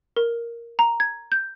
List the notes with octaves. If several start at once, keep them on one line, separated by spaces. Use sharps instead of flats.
A#4
A#5
G#6
G6